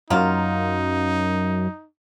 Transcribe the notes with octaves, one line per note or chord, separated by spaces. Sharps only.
F#2 F#3 A#3 D#4 F4